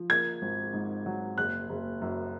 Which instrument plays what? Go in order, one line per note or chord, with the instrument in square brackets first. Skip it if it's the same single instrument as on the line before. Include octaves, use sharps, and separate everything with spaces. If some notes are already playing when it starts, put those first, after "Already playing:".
Already playing: [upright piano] F3
[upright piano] A#3 [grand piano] G#6
[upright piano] G#1
G#2
F#3
[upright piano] F#1 [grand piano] F#6
[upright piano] F#1
F#2